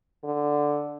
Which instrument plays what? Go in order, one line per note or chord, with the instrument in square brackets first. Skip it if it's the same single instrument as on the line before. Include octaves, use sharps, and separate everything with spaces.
[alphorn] D3